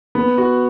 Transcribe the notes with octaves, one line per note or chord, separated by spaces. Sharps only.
B3
F#4